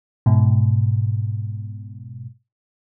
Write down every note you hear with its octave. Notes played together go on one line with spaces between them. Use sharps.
G#2 B2